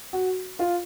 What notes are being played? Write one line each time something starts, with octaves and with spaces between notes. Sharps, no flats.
F#4
F4